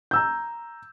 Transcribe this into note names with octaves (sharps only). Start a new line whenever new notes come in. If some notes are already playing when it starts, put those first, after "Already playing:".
A#5 E6 G6